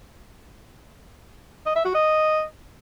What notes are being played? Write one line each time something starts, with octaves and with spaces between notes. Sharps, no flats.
D#5
E5
F#4
D#5